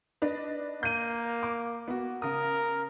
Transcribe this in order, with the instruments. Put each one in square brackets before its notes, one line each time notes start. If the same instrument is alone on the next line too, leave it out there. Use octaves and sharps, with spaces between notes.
[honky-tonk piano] D4 B4 D#5
[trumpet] A#3 [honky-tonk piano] G6 D#7
[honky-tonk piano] D6
B3 F#4
[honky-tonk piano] C#3 D#6 [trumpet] A#4